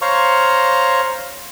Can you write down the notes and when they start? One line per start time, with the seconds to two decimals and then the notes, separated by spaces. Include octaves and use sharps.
0.02 C5 C#5 F5 A#5 C#6